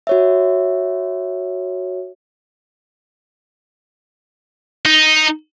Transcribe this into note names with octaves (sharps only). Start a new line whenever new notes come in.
F#4 C#5 E5
D#4